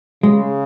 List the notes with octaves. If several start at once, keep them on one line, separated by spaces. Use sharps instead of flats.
C#3 G#3